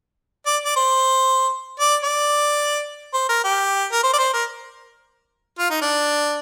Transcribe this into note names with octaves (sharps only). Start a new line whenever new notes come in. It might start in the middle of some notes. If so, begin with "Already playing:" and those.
D5
D5
C5
D5
D5
C5
A#4
G4
A#4
C5
D5
C5
A#4
F4
D#4
D4